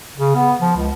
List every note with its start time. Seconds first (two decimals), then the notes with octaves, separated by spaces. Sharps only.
0.17 C#3
0.35 B3
0.60 F3
0.76 C#2